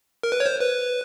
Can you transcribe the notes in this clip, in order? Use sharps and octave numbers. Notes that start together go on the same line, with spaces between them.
A#4
B4
C#5
C5
B4